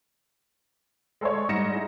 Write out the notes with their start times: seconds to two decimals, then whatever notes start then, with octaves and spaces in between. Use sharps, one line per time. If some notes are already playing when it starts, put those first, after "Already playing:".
1.21 G#3 A4 C5 C#5
1.49 G#2 G3 D#4 A#6 C#7 E7
1.73 D#4 E4 G#4